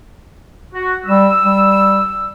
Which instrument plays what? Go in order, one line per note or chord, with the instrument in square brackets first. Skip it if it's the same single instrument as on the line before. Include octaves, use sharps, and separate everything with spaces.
[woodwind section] F#4
[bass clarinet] G3 [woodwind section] E6
[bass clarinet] G3